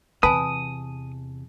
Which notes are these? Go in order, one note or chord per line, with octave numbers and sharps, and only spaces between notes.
E2 C3 B4 G#5 A5 D#6